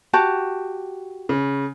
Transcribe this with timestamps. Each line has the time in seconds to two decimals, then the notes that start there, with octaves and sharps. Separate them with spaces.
0.13 F#4 G4 A5
1.29 C#3